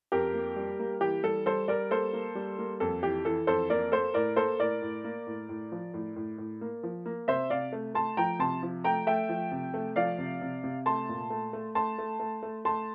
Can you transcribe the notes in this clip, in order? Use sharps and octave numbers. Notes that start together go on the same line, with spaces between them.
F2 G4 A#4
A#3
G3
A#3
E3 G4
G3 A4
G3 A4 C5
G3 A#4 D5
A#3 A4 C5
A#3
G3
A#3
F2 A4
E3 G4
E3 A4
F2 A4 C5
A#3 A#4 D5
A#3 A4 C5
A2 A#4 D5
A#3 A4 C5
A2 A#4 D5
A2
A#3
A2
A2
F3
A2
A2
A2
A#3
F3
A#3
C3 C5 E5
C3 D5 F5
A3
A3 A5 C6
F3 G5 A#5
C3 A5 C6
F3
A3 G5 A#5
A3 E5 G5
F3
C3
A3
F3 D5 F5
C3
C3
C3
A3 A5 C6
A#2
A3
A3
A3 A5 C6
A3
A3
A3
A3 A5 C6